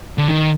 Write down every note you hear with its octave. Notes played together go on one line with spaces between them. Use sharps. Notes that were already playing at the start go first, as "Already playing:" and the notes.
D3
D#3